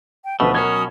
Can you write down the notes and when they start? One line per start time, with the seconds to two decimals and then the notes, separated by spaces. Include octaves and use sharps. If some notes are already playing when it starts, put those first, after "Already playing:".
0.25 G5
0.40 D2 B2 F3 A3 B4
0.55 F#3 C#4 F#4 A#4 B5 D#6 G#6